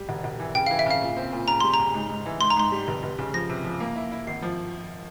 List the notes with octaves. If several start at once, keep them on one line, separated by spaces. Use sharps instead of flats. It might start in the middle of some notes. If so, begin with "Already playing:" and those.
Already playing: G3
E1
E1
E3
C#3 G5
E3 F5
E5
C#3 F5
A#2
C4
A#2
C#3 A#5
G3 C6
A#5
C#3
G#2
G#2
E3
G#2 C6
A#5
G#2 C6
G3
F1
F1
C#3
F3 A#6
C3
F3
A#3
E4
E4
G#1 C7
F3